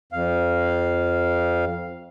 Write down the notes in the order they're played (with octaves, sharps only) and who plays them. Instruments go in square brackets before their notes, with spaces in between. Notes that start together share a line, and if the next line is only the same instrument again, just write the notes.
[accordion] F2 F5